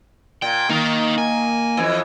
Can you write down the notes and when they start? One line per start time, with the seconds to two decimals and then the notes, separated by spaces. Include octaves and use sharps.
0.42 A#2 G5
0.70 D#3 A#3 D#4 A#4
1.18 G#5
1.77 F2 E3